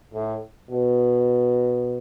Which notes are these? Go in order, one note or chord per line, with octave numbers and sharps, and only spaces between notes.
A2
B2